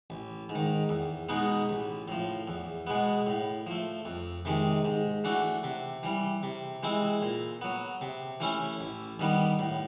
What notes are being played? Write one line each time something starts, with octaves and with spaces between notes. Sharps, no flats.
A1
G#2
D#3
E2
B2 G#3 B3 D#4
A1
A2 F3
E2
B2 G#3 B3
A2
F3 A3
F2
C3 D#3 G#3
G#2
E3 A3 D4 F#4
C3
E3 G3
C3
E3 G#3 C4 E4
A#2
F#3 B3
C3
E3 A3 C#4 E4
A1
G2 D#3 G3 B3
A2